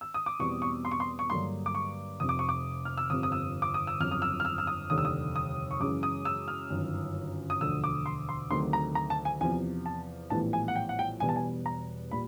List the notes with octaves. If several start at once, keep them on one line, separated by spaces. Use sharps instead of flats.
E6
D#6
D6
E2 B2 G3 C4 C#6
C#6
C6
C#6
C6
C#6
G2 D3 F#3 A#3 C6
D6
C#6
F1 F2 C3 D#6
D6
C#6
D6
F6
E6
G1 F2 C3 D#6
D#6
E6
D6
D#6
E6
G1 F2 C#3 F#3 F6
D#6
E6
F6
E6
E6
D#6
F1 D#2 D3 G3 D#6
E6
D#6
D#6
C#6
F#2 C#3 E3 G#3 D6
D#6
E6
F6
G1 F#2 D#3
D#6
E1 D2 D3 F3 E6
D6
C6
C6
D2 C3 D#3 F#3 A3 C6
A#5
A#5
A5
G#5
E2 C3 F3 G#5
A5
A#1 A2 E3 G3 B3 A5
G#5
F#5
G5
F#5
G5
E1 E2 B2 G3 B3 G#5
A5
G#5
A#5
A#2 G3 B5